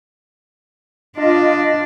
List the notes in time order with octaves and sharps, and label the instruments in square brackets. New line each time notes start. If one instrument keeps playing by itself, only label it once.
[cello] D4 [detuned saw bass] F4 [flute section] D#5